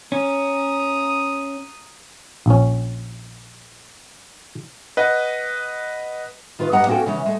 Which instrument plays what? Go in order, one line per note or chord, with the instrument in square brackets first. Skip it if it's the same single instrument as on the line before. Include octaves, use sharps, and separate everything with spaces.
[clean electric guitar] C#4 [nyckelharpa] A#5 D#6
[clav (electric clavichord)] A#1 C#4
[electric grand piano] B4 D#5 F#5
[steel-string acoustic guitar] D#3 F4 B4
G2 G3 D4 D#5 F#5 A#5
A#3 C4 C#4 F#4 A4 G5
C#3 E3 G#3 C#4
G#3 A3